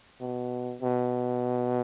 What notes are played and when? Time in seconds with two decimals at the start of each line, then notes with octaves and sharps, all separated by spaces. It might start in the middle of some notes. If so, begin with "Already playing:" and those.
0.21 B2
0.81 B2